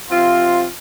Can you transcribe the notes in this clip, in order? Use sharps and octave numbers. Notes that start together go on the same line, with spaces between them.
C3 F3 C4 F4